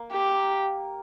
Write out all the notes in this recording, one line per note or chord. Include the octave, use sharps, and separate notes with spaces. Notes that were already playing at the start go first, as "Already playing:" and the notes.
Already playing: A#3
G4